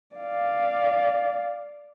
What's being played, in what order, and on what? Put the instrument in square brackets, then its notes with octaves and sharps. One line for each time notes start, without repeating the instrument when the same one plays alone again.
[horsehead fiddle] D5 F5